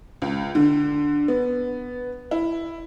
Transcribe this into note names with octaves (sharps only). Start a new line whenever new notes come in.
C#2
D3
B3
E4